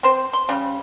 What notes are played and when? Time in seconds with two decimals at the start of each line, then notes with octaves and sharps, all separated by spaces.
0.03 C4 C5
0.33 C6
0.49 C#3 G3